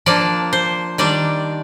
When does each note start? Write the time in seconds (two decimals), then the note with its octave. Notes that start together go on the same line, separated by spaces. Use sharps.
0.06 F3 A#3 D4 D5
0.53 C5
0.98 D#3 G3 D4 D5